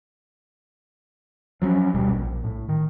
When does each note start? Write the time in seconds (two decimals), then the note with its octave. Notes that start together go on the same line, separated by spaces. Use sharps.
1.62 F3 F#3 A3 C#4
1.94 D1 B2 G3
2.12 A#1
2.44 A2
2.68 D#3